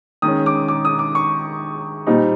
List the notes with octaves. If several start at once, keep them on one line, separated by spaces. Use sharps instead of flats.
D#3 G#3 C#4 D#6
D6
D6
D#6
D6
C#6
A#2 G3 C4 D#4